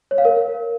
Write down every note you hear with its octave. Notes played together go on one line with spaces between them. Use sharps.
C#5
F5
A#4